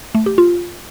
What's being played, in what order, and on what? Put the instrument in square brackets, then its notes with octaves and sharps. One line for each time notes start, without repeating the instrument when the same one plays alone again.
[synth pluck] A3
G4
F4